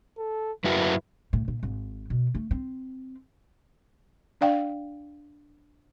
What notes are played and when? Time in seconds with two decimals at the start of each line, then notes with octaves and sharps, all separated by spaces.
0.18 A4
0.64 F#2 E4 F#4 B4
1.33 A2
1.48 A#2
1.63 G#1
2.10 B2
2.35 A3
2.51 C4
4.41 D4 D5 F5 G5